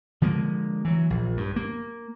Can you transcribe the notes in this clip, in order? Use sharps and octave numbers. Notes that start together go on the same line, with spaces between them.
D3 F3 G#3 A#3
E3 F#3
A#1
G2
A#3